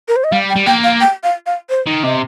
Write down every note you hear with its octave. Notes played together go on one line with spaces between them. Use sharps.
A#4
C5
D#5
G3 F5
G5
G3
A#3 G5
F5
G5
F5
F5
C5
D#3
C3 D#5